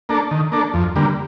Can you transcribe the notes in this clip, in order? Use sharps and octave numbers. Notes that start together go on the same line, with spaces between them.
A#3 D4 A4
D#3
A#3 D4 A4
F2
D3 G3 A#3